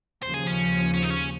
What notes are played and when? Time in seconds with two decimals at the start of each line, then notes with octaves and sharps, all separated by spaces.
0.23 D#2 C#3 F3 C5
0.34 G#4
0.47 C#4
0.94 C#4
1.03 D#4
1.10 C#4